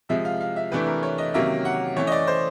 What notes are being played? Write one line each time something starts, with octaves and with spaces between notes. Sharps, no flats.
C3 F3 G#3 E5
F5
F5
E5
C3 E3 A3 D4 B4
A#4
C#5
D#5
C3 D#3 F#3 A#3 C#4 E5
F#5
E3 A3 C#4 C#5
D#5
D5
C5